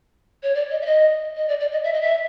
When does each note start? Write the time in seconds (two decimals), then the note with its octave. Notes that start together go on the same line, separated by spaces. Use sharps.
0.43 C#5
0.55 D5
0.71 D#5
0.82 E5
0.86 D#5
1.37 D#5
1.48 D5
1.60 D5
1.72 D#5
1.84 E5
1.93 D#5
2.02 E5